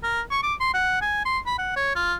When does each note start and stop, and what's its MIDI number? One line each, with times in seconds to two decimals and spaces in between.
0.04 0.21 70
0.31 0.39 85
0.43 0.54 86
0.60 0.73 84
0.74 1.01 78
1.02 1.22 80
1.26 1.39 84
1.46 1.55 83
1.59 1.72 78
1.77 1.92 73
1.96 2.15 65